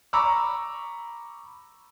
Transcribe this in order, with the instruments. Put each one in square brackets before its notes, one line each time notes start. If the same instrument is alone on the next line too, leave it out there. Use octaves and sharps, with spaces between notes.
[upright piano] A#5 B5 C#6 D6 E6